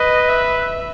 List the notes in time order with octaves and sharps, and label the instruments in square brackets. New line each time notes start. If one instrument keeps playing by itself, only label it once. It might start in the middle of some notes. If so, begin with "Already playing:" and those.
Already playing: [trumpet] B4 [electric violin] D#5
[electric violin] E5